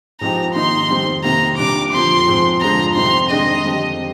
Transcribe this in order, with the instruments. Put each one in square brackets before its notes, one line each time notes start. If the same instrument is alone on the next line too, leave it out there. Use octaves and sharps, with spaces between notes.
[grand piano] G#2 F3 C4 D#4 G4 [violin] A#5
[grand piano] D#3 A#3 D#4 [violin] C6
[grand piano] F2 D#3 G3 C4 G4
[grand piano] C3 D#3 A#3 [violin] A#5
[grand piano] A#2 G3 D4 [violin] D6
[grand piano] F2 D3 F3 [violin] C6
[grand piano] G#2 F3 C4
[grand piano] F2 D3 F3 G#3 D4 [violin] A#5
[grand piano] F2 C3 G3 C4 D#4 [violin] C6
[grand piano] D#3 G#3 D4 G4 C5 [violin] D#5
[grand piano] F2 D3 G3 C4 G4